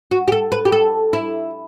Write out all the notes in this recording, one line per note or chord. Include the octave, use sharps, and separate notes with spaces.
F#4
G4
A4
B4
G4
A4
E4